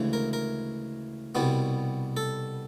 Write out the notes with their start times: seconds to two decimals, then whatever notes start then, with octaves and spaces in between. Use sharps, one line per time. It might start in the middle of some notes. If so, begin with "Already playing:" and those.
Already playing: D2 C#3 E3 G#3
0.13 A#4
0.33 A#4
1.35 C2 B2 G3 B3
2.17 A4